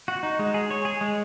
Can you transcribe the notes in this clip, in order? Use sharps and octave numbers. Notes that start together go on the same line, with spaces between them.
F#4
D#4
G#3
G#4
C#5
G#4
G#3